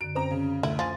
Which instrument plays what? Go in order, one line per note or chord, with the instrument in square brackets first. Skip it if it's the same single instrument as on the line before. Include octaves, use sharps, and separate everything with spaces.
[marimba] F#2 D3 [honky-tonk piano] D7
[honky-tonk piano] C4 A#5
C#3
[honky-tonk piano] D2 [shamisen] E4
[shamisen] F3 [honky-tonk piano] G#5 A6 [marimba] C6